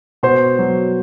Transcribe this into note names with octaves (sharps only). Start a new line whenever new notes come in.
B2 C5 C6
F#3